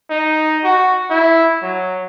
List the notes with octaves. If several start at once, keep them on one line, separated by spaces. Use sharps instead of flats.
D#4
F#4
E4
F#3